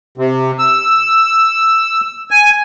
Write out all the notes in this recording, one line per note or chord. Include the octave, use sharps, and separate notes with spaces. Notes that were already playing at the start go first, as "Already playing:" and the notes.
C3
E6
G#5